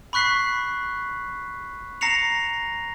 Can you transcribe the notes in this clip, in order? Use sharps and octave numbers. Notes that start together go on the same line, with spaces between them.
B5 C#6 F#6 B6 C7
A#5 A#6 C7 C#7 F7